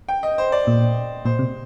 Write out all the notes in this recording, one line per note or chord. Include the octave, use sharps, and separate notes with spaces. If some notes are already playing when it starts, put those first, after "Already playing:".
G5
D#5
C5
D5
A#2
A#2 C5
C3